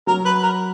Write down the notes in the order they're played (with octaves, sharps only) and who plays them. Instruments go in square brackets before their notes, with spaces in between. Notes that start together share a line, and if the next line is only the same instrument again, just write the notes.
[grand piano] F#3 [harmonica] A#4
[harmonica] B4
A#4